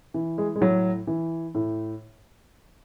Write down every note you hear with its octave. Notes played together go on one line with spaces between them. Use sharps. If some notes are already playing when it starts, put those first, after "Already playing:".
E3
G#3
G#3
A2 F#3
E3
A2